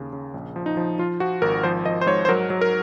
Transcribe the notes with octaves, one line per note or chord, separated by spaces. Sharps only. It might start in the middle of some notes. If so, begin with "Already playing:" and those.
Already playing: D#2 C#3
C#3
A#1
F3
D#4
F3
F3 F4
F3 F#4
G#1 A#4
F3 C5
F3 D#5
C5
G#2 C#5
C5
F#3 A#4
F#3
A#4